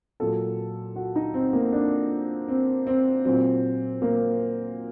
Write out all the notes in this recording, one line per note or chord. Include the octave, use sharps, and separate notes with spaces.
A#2 F#3 A4
F#4
D#4
C4
A#3
D4
C4
C4
A#2 F#3 C4
A#3